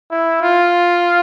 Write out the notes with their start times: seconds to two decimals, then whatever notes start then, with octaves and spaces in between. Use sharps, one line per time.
0.11 E4
0.43 F4